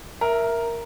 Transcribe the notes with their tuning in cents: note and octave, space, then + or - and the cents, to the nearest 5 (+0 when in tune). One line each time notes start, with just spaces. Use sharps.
A#4 +0 E5 +0